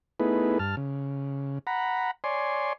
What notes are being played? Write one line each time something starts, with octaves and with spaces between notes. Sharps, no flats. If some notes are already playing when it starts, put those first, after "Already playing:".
A3 B3 D#4 E4 G#4 B4
G2 A5 F6
C#3
F#5 A#5 B5
C#5 D5 G#5 C6